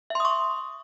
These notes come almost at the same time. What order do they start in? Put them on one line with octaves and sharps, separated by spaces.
E5 C6 D#6 C#6